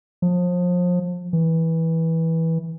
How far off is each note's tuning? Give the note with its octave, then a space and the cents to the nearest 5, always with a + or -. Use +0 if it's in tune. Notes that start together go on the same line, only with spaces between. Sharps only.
F3 +30
E3 -15